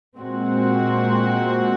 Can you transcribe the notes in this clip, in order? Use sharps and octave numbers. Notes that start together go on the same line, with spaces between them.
A#2 G#3 C4 F#4